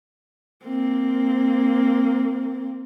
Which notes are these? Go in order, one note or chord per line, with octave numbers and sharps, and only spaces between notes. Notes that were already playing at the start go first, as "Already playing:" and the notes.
A#3 C4